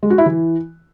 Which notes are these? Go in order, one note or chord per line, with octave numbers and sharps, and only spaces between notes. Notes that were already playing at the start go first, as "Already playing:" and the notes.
G#3
F#4
E4
E3